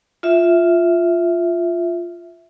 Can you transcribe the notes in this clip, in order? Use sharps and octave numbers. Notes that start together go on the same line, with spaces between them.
F4 E5